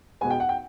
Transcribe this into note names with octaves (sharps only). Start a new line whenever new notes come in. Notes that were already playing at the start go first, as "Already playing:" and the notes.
B2 G#3 B3 G#5
G5
F#5
G5